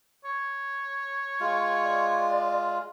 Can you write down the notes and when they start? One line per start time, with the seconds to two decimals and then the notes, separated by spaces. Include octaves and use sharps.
0.25 C#5
1.40 G#3 F4
1.84 D5